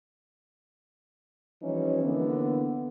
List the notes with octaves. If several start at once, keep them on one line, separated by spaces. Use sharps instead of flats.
E3 F3 G3 C#4 D#4 E4
D3 E3 A#3 B3